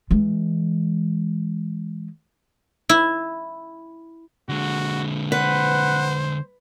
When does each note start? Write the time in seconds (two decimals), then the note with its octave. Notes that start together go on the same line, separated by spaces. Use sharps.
0.11 E3 G#3
2.89 E4
4.49 D3 G#3 F#4
5.32 B4 C5 F#5